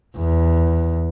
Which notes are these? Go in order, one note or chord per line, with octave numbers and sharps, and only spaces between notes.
E2